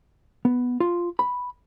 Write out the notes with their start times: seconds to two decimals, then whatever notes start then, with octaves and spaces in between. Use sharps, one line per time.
0.45 B3
0.80 F4
1.19 B5